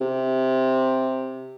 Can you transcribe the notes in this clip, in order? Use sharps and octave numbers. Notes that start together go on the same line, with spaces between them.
C3